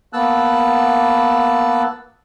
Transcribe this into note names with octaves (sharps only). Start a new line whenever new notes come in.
A#3 B3 A5 E6 F#6